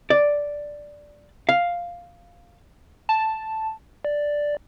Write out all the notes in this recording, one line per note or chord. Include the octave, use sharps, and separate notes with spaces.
D5
F5
A5
D5